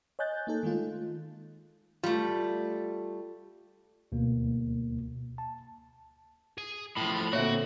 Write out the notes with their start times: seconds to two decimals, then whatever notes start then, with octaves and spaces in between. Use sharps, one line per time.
0.19 C#5 D#5 G#5 F#6 G6 A6
0.47 A#3 D#4 A4
0.63 D#3 G#3 A3 F4
2.04 G3 A3 F4
4.12 D2 B2 A#3
5.38 A5
6.58 G#4
6.97 A2 F3 B5
7.33 A#2 D3 A#3 C4 F#4 C#5 E5